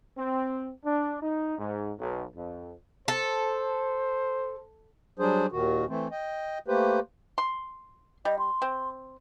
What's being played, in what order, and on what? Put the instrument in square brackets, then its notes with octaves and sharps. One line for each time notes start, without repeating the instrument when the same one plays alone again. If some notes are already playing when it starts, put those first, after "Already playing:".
[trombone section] C4
D4
D#4
G#2
B1
F2
[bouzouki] A4 [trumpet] C5
[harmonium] F#3 G3 D4 G#4 C5
D#2 A#2 D#3 F#4
E3 A3 C4
D#5 G5
A3 A#3 G4 B4 C5
[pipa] C6
[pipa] G3 [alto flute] D#5
[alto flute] C6
[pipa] C4